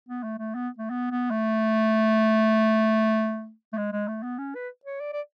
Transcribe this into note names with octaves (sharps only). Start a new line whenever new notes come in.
B3
A3
A3
B3
A3
B3
B3
A3
A3
G#3
G#3
A3
B3
C#4
B4
C#5
D5
D5